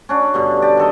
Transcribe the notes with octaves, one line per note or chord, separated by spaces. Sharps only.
C#4 D4 F#4
G2 B2 D3
G4 D5
D#3 A4 D#5